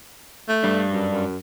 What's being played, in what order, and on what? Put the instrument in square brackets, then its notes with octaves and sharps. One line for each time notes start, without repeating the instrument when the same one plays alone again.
[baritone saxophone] A3
[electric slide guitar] G2 G3 D4
[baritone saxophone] F#2
F#2